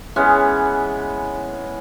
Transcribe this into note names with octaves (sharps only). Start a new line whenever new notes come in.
E3 G#3 B3 C#4